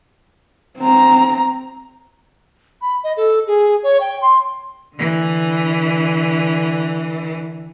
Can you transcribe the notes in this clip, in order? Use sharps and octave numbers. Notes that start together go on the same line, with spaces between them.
C4 A#5
B5
D#5
A4
G#4
C#5
G5
C6
D3 E3